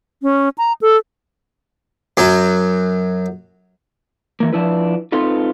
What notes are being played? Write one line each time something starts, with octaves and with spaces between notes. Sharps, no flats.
C#4
A#5
A4
F#2 F#3
E3 A#3
F3 D4 E4 B4
C4 D#4 F4 A4 B4